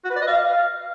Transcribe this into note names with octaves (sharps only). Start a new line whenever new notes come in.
F#4
B4
D5
D#5
F5